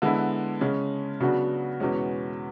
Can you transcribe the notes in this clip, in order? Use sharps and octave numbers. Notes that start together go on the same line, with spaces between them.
D3 G#3 B3 E4
C#3 G#3 C#4
C#3 F#3 B3 D4 F#4
E2 B2 G#3 C#4